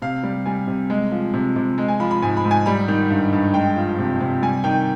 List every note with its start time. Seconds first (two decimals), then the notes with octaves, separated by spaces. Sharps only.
0.02 C3 F5
0.23 G3
0.46 G3 G#5
0.67 C3
0.90 G#3
1.12 F3
1.34 C3
1.56 C3
1.78 G#3
1.88 G#5
2.00 F3 B5
2.11 B5
2.22 G#2 G#5
2.37 B5
2.45 G#2
2.51 G#5
2.66 G3 B5
2.88 D#3
3.10 G2
3.33 G2
3.54 G#3 G5
3.76 F3
3.99 C3
4.21 C3
4.42 G3 G#5
4.64 D#3 G5